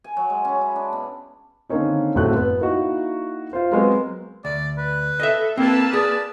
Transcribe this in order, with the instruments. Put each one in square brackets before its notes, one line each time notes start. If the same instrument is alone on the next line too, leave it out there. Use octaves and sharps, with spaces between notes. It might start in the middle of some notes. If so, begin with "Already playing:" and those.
[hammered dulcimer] G#5
F#3
G#3
C#4
E4
D4
B2
[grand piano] D3 D#3 A#3 C4 C#4 D#4
F#1 A2 A3 C4 F#4 F#6
B3
A#3 D#4 E4 F#4
F4 C5
F#3 G#3 B3 C4 F#4 A#4
[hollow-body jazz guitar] D2 [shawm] D5
[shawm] B4
[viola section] A4 [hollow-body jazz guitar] D#5 E5
[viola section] A#3 B4 A5 [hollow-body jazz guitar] C4 [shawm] E4
[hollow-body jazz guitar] G#4 [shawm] D5